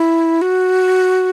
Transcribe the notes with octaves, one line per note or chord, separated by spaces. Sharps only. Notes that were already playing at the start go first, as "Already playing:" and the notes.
Already playing: E4
F#4